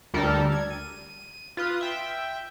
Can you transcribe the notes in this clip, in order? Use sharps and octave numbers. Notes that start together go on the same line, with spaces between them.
D2 G3 A4 A#4
G#6
D#7
F4 B4 D#6
E5 G5